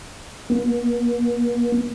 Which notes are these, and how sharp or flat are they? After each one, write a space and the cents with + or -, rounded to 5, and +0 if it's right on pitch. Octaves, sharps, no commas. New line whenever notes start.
B3 -45